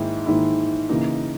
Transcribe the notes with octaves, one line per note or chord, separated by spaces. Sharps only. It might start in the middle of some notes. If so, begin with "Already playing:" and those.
Already playing: G#2 D#3 A#3 E4
G#2 D#3 A#3 E4
C#3 E3 A#3 D#4